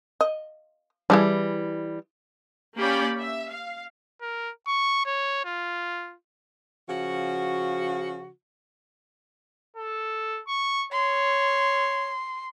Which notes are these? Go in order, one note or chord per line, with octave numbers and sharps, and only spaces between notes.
D#5
E3 G3 E4 G#4 A4
A#3 C#4 G4 D5 B5
E5
F5
A#4
C#6
C#5
F4
C#3 F3 F#4
A4
C#6
C#5 C6